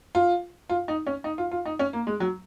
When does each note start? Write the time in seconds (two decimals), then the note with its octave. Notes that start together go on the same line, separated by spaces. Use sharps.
0.15 F4
0.70 F4
0.88 D#4
1.07 C#4
1.24 D#4
1.38 F4
1.51 F4
1.66 D#4
1.79 C#4
1.93 A#3
2.07 G#3
2.20 F#3